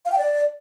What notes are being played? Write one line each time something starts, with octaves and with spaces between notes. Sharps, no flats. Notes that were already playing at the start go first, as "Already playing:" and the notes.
F5
G5
D5